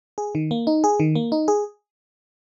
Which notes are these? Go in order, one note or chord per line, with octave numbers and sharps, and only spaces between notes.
G#4
D#3
A#3
D#4
G#4
D#3
A#3
D#4
G#4